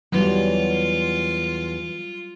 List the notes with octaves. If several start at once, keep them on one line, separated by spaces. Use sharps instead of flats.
E2 E3 F#3 G3 F4